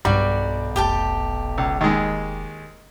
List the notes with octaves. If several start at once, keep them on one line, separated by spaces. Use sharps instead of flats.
B1 G2 G3 D#4 F#4 D5
F1 G4 G5 A5
C#2
D#2 G#3